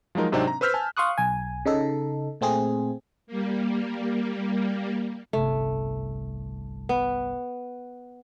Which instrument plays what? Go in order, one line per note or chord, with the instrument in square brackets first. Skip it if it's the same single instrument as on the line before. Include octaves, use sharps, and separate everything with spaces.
[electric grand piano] F3 F#3 G#3 D#4 A#4
G#2 C3 F#3 C4 D4 D#4
A#5
B4 C5 E6 F6 G6 B6
G#5 A5
[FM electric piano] F5 C6 C#6 D#6 F#6
B1 G#5
C#3 D#4 A4
A#2 A3 C4 G#4
[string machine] G3 A#3
[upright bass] G1 C2 [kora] A3
[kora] B3